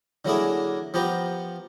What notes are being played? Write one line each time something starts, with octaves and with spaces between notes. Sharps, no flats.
D3 F#3 A#3 E4 G#4
F3 B3 G4 A#5